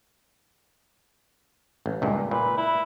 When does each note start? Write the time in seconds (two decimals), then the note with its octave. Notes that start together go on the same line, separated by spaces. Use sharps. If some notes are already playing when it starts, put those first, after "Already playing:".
1.86 A1
2.02 C#2 G2 A#2
2.31 A#2 B4
2.57 E4